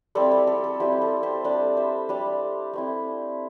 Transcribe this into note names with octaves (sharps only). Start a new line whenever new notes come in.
G3 C4 E4 A4 D5
A4 D5
A4
A4
G3 C4 E4 G4
A4
G4 C5
G3 D4 A4 D5
C5 E5
G3 D4 A4 D5
A3 C4 E4